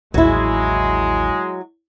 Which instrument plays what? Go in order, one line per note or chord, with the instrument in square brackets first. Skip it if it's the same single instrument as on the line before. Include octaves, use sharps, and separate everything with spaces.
[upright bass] A1 D#2 [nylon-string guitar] F#3 E4 [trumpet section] G#3